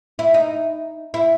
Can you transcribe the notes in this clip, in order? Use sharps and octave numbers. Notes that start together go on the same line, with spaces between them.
E4
D#4
E4